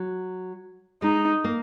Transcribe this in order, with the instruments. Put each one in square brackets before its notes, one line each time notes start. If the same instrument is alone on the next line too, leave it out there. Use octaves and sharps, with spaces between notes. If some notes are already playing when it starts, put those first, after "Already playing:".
Already playing: [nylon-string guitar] F#3
[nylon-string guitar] G#3 [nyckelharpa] D#4
[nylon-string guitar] A#3